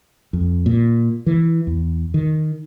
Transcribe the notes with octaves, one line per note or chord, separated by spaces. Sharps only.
F2
A#2
E3
E2
D#3